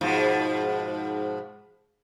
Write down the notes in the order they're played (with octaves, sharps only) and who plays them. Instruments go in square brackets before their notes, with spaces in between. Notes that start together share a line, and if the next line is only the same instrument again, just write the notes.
[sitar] G#2 B2 F3